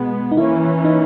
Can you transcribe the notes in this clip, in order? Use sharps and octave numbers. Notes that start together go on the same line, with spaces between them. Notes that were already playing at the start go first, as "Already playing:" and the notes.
Already playing: B2 G#3 B3
D#4
E3 A#3 C#4 E4
D#4